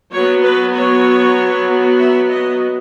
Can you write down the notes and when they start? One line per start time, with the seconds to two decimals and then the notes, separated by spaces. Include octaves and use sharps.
0.12 F#3 B3 C#5
0.43 B4
0.74 C#5
1.98 E5
2.29 D#5